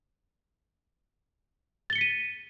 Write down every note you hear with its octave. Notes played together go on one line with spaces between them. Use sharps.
A6 B6 C#7 D#7 G7